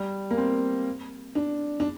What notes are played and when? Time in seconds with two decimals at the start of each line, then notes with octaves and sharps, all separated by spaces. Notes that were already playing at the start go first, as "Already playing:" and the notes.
Already playing: G3
0.31 A#3
0.38 C4
1.35 D4
1.80 D4